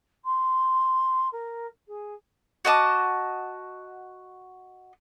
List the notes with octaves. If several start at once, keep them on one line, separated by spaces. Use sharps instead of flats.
C6
A#4
G#4
F#4 D#5 A5 D6